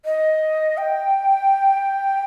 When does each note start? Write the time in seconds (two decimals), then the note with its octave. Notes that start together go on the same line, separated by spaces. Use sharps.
0.05 D#5
0.78 G5